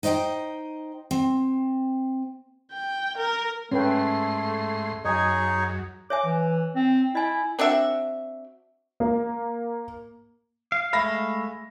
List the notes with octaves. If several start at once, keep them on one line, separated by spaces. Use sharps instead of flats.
D#4 C5 D#5 E5 G5
C4
G5
A#4
G#2 A3 C#4 B4 G5 C6
F#2 D#4 G#4 C#5 D#5 G#5
C#5 E5 G#5 D6
E3
C4
E4 D#5 G#5
C4 D4 F#4 E5
A#3
F5
G#3 A3 E5 F5 B5 A#6